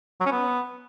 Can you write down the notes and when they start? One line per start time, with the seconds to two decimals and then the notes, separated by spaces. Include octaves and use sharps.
0.20 F#3
0.26 C#4
0.31 B3